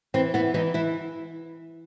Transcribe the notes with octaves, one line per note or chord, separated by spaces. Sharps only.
E3 C4
E3 B3
E3 D#4
E3 E4